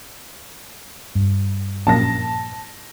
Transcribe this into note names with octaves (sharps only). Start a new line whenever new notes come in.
G2
A#1 F#2 A5 A#6